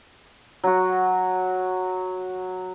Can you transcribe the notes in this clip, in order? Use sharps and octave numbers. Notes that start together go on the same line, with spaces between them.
F#3 F#4